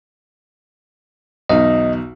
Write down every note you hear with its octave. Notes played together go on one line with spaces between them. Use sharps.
B1 E2 D#4 D#5